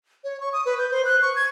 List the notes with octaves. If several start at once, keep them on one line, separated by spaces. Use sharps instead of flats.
C#5
C#6
D#6
B4
G6
C5
F#6
C#6
G#6